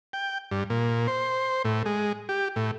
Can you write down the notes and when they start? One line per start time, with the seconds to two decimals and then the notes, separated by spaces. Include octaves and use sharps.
0.13 G5
0.51 G2
0.70 A#2
1.08 C5
1.65 A2
1.86 G#3
2.29 G4
2.56 A2